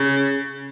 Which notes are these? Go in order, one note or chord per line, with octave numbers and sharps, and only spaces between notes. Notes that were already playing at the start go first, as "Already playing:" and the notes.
Already playing: C#3